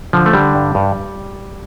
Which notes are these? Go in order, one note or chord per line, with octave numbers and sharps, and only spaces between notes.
D3 F3
A3
D3 G3
G2
G2